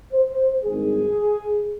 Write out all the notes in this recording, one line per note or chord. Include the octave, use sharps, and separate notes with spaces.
C5
G#1 G2 D#3 G#4